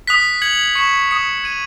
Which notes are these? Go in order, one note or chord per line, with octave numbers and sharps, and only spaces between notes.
D#6 F#6 B6
G#6 C#7 F#7
C#6 G#6 C#7 E7
D#6 G#6 C#7 E7
G#6 D#7 F#7